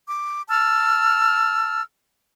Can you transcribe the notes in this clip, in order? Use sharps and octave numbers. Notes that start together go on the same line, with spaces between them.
D6
A5 E6 F6